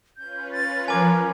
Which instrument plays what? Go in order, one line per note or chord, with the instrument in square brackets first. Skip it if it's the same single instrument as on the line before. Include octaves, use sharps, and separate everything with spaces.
[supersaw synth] C#4 F4 B4 [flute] G6
[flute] A6
[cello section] F3 [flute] A#4 [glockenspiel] G#5 D6 G#6